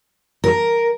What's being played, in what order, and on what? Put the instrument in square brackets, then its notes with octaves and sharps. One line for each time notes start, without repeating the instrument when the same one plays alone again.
[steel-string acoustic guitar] A#4